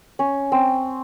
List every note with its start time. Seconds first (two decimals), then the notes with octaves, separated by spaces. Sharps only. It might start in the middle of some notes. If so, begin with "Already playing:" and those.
0.19 C#4
0.52 C4